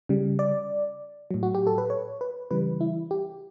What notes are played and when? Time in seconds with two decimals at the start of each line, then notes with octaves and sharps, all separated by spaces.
0.09 C#3 G3
0.39 D5
1.31 A2 F#3
1.43 F#4
1.55 G4
1.67 A4
1.78 B4
1.90 C#5
2.21 B4
2.51 C#3 E3 G3 B4
2.81 E4
3.11 G4